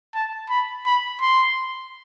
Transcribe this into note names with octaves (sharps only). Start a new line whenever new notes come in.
A5
B5
B5
C6